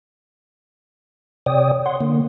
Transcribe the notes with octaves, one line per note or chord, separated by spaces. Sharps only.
C3 C#5 D5 G5 D#6
C#5 F#5 C6
D3 A#3